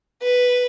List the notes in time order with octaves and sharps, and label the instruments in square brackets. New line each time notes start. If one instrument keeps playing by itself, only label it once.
[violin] B4